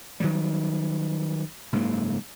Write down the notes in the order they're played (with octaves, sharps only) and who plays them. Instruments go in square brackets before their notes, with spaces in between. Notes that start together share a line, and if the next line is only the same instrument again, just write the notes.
[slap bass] D#3 F#3 G3
F#1 G#2 C#3 A#3